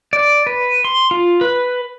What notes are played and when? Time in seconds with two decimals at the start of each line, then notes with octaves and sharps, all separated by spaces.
0.13 D5
0.47 B4
0.84 C6
1.11 F4
1.41 B4